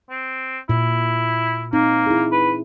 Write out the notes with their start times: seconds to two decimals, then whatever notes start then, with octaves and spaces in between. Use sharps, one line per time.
0.10 C4
0.69 A#2 E4
1.73 A#3 C4 D#4
2.06 E4 G#4
2.32 B4